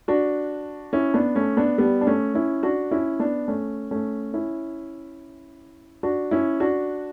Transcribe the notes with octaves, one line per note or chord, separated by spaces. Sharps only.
D4 F#4
C#4 E4
B3 D4
A3 C#4
B3 D4
G3 B3
D4
A3 C#4
C#4 E4
D4 F#4
C#4 E4
B3 D4
A3 C#4
A3 C#4
C#4 E4
D4 F#4
C#4 E4
D4 F#4